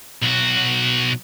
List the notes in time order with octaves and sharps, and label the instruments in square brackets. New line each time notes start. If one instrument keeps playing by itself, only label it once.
[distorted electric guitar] B1 F#4